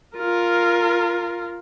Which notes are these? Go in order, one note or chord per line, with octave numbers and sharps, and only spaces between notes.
F4 A#4